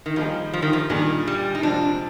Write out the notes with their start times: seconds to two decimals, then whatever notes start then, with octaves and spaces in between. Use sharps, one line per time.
0.06 D#3
0.16 D#3 F3 G3 A#3 D#4 G#4
0.53 F3
0.62 D#3
0.73 F3
0.90 A#2 D#3 G3 D4 G#4
1.27 G3
1.55 D#4
1.63 C3 F3 G#3 C4 D4